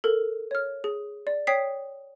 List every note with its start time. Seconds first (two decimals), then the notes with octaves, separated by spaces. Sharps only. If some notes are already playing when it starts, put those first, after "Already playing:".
0.04 A4 A#4
0.51 C#5 F6
0.84 G#4
1.27 D5
1.47 C#5 G5 D#6 B6 C7